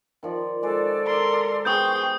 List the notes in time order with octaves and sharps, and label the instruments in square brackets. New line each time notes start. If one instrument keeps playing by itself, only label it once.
[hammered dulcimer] D#3 F3 D5
[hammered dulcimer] G#3 F#4 C5 [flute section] A4 D5
[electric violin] A#4 C6
[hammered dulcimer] B3 G4 C5 [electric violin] G#4 G5 [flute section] C#6 [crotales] D#6 G6